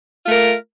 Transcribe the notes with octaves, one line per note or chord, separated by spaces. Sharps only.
A3 F4 A#4